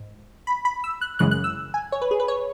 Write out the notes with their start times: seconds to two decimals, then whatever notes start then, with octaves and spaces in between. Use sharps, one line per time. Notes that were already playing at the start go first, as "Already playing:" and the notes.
Already playing: G#2
0.47 B5
0.65 B5
0.84 E6
1.01 F#6
1.19 F#2 C#3 E3 G#3 F#6
1.31 F#6
1.44 E6
1.74 G#5
1.92 C#5
2.02 B4
2.11 G#4
2.20 B4
2.28 C#5